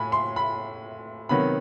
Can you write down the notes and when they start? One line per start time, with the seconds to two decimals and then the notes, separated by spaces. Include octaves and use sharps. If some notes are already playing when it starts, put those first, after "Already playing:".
Already playing: A2 G#5 B5
0.12 C6
0.36 B5
1.29 C3 D#3 F#3 B3 B5